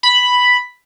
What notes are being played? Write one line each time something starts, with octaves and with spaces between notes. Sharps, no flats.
B5